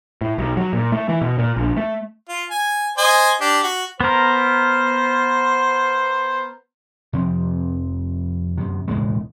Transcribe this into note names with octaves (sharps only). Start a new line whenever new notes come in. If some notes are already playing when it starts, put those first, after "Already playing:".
A2
B1
F#3
A#2
A3
E3
B2
A#2
A#1
A3
F4
G#5
C5 D#5 G#5
D4 G4
F#4
B3 A#4 C5
F2 C3 F3 C4
F#2 C3
E1 A2 C#3 G#3